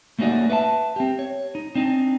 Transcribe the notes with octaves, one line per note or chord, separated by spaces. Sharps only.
A3 A#3 C#4 D#4 F#4 D5
B4 E5 F#5 A5
C4 G4
C#5
D#4
C4 D4 D#4